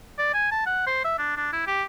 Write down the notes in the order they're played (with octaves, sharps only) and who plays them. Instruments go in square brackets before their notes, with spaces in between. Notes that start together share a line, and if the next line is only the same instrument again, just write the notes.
[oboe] D5
G#5
A5
F#5
C5
E5
D4
D4
E4
G4